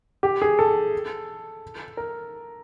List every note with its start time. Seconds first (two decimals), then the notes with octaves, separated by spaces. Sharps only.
0.23 G4
0.42 G#4
0.59 A4
1.97 A#4